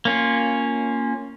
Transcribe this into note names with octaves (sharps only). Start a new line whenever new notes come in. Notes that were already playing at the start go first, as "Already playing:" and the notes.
A#3 C#4 F4